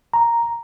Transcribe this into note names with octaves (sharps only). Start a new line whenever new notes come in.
A#5